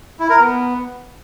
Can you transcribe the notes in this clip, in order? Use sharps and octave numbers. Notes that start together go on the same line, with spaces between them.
E4
A#4
B3